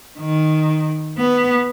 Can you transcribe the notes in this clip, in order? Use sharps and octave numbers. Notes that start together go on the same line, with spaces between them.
D#3
B3